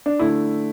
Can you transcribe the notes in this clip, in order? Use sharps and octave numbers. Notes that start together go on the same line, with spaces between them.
D4
D3 A3 E4